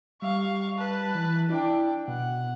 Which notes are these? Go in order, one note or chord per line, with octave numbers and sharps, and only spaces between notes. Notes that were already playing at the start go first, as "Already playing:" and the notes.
G3 F5 C#6
B4 A5
E3
D4 E4 G5
B2 F#5